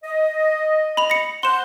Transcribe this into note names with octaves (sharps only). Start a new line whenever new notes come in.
D#5
B5 F7
A#6 C#7
C5 F#5 C6 E7